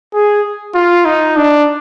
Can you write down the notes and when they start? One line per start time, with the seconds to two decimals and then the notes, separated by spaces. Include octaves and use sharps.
0.13 G#4
0.75 F4
1.05 D#4
1.36 D4